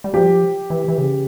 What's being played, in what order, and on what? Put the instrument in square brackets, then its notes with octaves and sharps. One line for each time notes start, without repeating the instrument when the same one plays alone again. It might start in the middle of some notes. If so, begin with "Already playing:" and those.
[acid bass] G3
[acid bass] F3 [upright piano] G4
[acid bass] E3
E3
C#3